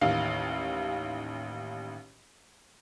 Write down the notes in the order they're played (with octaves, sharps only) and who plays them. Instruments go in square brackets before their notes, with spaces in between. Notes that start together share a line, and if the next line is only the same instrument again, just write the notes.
[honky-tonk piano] A1 D#2 F5